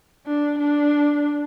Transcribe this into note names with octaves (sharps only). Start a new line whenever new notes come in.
D4
D4